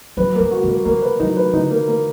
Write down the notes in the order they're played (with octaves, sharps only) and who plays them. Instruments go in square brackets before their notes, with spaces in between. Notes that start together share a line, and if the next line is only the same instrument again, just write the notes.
[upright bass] F#3 [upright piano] B4
[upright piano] A#3
[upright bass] G3
[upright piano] F#4
[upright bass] G3
[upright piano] A#3
[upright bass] G3 [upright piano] A#3
[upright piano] B4
[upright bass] F#3 [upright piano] D#4
[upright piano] B4
[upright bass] D3 [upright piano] D#4
[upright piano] A#3
A#3